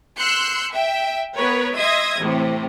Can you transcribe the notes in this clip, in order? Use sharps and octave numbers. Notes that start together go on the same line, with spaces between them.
C6 E6 F#6 G6 C7 C#7
E5 G5
B3 A#4 B4 C#5
D#5 E5 C6 D#6 G#6 A#6
A2 C3 E3